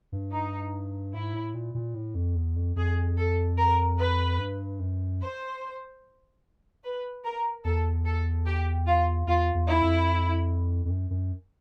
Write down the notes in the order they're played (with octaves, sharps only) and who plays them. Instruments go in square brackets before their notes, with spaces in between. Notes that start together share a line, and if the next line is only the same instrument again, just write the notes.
[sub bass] G2
[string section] D#4
[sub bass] G#2 [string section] E4
[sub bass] A2
A#2
A#2
A2
F2
E2
F2
[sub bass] F2 [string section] G#4
[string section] A4
A#4
B4
[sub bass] G2
F#2
[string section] C5
B4
A#4
[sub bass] E2 [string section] A4
[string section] A4
G4
F4
[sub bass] E2 [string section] F4
[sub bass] E2
[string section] E4
[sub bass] F2
F2
F#2
F#2